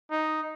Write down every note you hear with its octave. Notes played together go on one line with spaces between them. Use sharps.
D#4